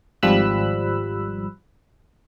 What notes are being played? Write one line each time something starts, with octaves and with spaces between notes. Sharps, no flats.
G#1 F3 G3 B5 E6 F#6